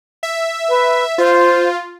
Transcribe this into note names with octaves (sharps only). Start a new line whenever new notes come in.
E5
B4
F4 C5